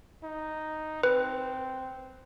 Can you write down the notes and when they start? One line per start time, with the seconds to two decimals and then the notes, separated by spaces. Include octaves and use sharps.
0.23 D#4
1.03 C4 B4